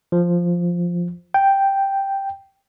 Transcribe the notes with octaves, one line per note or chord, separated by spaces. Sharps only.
F3
G5